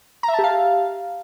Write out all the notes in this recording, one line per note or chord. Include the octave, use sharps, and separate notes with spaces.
A#5
E5
A5
G4
F5